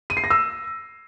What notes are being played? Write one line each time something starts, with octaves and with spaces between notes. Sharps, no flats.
D#7
C7
A#6
E6